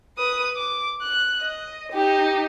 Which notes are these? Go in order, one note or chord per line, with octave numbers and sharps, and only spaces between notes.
B4 D#6
D6
F#6
D#5
D#4 G4